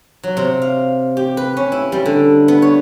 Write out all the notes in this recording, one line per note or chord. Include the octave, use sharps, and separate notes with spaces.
F#3
C3
F5
G4
B4
C#4
E4
G3
D3
B3
C#5